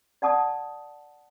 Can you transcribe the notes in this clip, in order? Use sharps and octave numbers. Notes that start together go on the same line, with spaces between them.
D5 F#5 A5 D#6